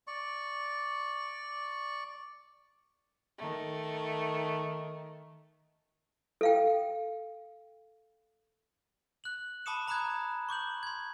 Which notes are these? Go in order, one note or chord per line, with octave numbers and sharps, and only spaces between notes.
D5 C#6
D#3 A3
A4 F5 G5
F#6 F#7
A5 B5 D6 D#6 C#7 E7
A#5 B5 D6 D#6 F#6 G#6
C#6 D6 G6 F#7
C6 G#6